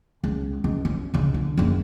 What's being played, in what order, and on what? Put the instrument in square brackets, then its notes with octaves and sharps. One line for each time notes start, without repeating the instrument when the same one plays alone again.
[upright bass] C#2
C#2
C#4
C#2 C#3
D3
F#1 D#2